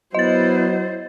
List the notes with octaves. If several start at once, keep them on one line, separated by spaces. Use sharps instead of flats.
F#3 B3 E4 C5 D#5 A6